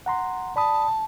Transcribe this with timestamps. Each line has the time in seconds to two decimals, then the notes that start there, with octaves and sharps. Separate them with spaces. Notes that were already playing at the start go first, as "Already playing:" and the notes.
0.06 F#5 A#5 C6
0.56 D5 A5 B5 D#6